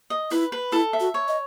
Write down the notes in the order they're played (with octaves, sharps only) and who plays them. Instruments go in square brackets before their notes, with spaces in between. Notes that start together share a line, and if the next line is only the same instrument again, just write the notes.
[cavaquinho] D#5
[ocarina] E4 [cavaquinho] B4
[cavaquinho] B4
[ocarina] E4 [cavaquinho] A4
[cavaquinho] E5
[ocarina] F#4
[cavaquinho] C#5
[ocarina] D#5